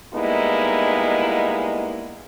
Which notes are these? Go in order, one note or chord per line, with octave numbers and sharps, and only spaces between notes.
G3 G#3 A#3 B3 D#4 E4